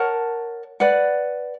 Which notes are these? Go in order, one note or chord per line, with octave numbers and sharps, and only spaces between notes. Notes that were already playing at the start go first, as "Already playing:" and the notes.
Already playing: A#4 C#5 F#5 A5
B4 D5 F#5